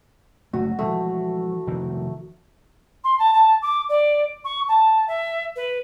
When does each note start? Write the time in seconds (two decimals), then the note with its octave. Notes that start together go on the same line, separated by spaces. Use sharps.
0.53 F#1 A3 F#4
0.79 E3 F3 G#3 A3
1.67 F1 D#3 E3
3.04 C6
3.19 A5
3.33 A5
3.62 D6
3.89 D5
4.44 C#6
4.68 A5
5.08 E5
5.56 B4